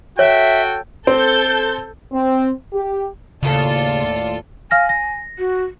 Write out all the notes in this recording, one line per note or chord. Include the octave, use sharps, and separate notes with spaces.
F#4 A4 C#5 E5 G5
C4 A4 G6
C4
G4
D#2 A2 C#3 F4 A4 D5
F5 G#5 F6 A#6
A#6
F#4